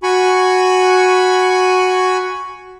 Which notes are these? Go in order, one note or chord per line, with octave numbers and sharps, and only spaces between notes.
F#4 G#5 B5 C#6